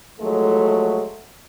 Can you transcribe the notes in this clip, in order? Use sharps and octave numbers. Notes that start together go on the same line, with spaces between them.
D#2 F3 F#3 G#3 A3